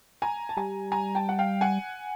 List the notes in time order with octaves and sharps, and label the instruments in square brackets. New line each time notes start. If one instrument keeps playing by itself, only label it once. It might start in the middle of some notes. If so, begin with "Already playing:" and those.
[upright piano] G#5 A#5
A5
[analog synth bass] G3 [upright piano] G#5 A#5
[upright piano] G#5 A#5
G5 A5
F#5
F5 G5
F#5 G#5